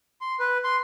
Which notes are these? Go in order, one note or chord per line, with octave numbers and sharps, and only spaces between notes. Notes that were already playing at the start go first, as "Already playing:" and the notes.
C6
B4
C6